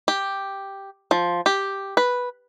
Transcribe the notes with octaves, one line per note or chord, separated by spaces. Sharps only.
G4
F3
G4
B4